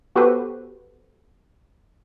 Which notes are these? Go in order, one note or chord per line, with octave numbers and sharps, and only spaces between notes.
B3 F#4 G4 A4 B4 C5